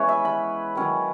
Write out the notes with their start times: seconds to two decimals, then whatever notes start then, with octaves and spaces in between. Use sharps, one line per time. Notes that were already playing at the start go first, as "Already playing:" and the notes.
Already playing: E3 G#3 B3 C#4 B4 C#5
0.09 E5
0.25 B5
0.75 D#3 F#3 C#4 E4